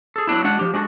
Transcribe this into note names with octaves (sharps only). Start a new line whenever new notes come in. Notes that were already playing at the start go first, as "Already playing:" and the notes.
G#4 A4
F#3 B3 D4 E4
G#3 D4 F#4 F#5
F3 G4
G#3 D4 F#4 G4 A4